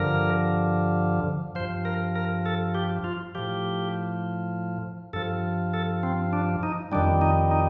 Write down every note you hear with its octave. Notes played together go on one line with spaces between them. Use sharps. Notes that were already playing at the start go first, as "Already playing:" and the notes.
Already playing: G2 D3 F3 A#4
G2 F3 C5
A#4
A#4
A4
G4
F4
A2 F3 G4
G2 F3 A4
A4
C4
D4
D#4
F2 D#3 G3 D4
D#4
D#4